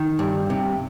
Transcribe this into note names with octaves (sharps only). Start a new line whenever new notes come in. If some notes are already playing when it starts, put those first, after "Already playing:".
Already playing: D#3
G2
C3